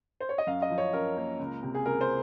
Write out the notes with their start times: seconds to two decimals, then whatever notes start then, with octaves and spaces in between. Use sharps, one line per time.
0.20 C5
0.29 C#5
0.38 D#5
0.47 F#2 F5
0.62 D#5
0.70 F3
0.78 C#5
0.93 C#4 A#4
1.17 A#3
1.39 C#2
1.63 C3
1.75 G#4
1.86 C#2 A#4
2.01 C5